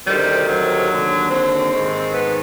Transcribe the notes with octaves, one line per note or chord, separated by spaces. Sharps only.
D2 C3 D#3 G3
F#3
D#2 D3
C4
G#2 D#3
B3